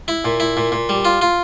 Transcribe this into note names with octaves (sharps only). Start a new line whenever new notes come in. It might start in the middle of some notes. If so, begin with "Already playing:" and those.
E4
A#2
E4
A#2
A#2
G3
F4
F4